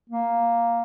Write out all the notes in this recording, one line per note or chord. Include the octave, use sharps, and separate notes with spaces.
A#3